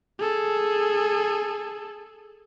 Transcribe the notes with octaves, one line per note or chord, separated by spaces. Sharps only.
G#4 A4